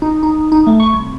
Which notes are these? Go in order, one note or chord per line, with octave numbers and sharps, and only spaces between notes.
D#4
D#4
D#4
A3
C#6
C2